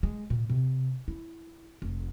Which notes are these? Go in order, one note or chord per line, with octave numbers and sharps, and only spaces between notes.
G#3
A#2
C3
E4
F1